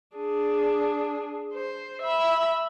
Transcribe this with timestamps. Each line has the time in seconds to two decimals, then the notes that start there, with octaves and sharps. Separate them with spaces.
0.17 D4 G#4
1.53 C5
2.02 E5 B5